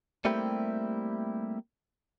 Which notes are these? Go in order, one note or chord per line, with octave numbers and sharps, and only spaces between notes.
G3 A3 A#3 C4 E4 G4